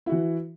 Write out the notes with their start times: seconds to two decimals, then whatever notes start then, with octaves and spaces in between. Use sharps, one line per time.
0.06 E4
0.09 F#4
0.12 E3